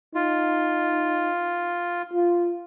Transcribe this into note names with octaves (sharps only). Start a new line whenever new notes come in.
D#4 F4
F4